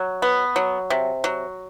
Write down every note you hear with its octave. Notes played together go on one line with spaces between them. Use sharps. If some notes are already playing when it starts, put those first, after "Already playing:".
Already playing: F#3
B3
F#3
C3
F#3